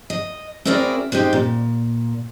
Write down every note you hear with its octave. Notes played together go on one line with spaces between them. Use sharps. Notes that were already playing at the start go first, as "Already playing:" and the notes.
D#5
C4 E4 F#4 G#4 A#4 D5
G#3 C4 D#4 G4
A#2